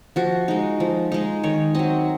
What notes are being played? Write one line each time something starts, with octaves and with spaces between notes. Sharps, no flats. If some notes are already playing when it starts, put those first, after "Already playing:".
F3 F#4
G#3 D#4
F3
G#3 D#4
D#3 C#5
F#3 C4 D#5